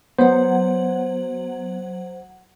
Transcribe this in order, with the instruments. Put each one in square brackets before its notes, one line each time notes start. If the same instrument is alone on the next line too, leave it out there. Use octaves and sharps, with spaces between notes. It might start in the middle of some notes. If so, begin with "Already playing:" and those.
[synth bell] F#3 F#5 [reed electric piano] B3 [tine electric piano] C5